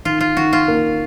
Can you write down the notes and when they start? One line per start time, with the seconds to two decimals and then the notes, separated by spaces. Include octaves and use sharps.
0.05 D#3 F4
0.21 F4
0.37 D#3 F#4
0.53 F4
0.68 A#3